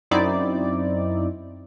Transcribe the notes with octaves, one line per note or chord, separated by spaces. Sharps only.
F#2 C4 D#4 E4 D5